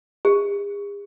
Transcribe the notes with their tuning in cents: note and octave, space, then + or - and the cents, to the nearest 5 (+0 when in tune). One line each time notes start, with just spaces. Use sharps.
G#4 -45